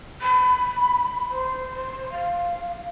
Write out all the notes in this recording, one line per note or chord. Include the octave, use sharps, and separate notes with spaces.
B5
C5
C5
F5